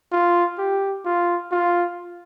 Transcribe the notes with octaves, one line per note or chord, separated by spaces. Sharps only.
F4
G4
F4
F4